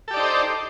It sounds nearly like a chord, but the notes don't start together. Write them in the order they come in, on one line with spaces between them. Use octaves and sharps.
A4 G4 D5 D#4 C5